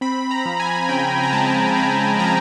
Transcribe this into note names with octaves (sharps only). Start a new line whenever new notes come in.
C4 B5
A#5
F3
G#5
C#3 G5
A#5
G#3 A5
C4 A#5
F3 A#5